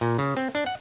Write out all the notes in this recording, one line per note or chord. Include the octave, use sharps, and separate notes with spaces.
A#2
C#3
C4
D4
F#5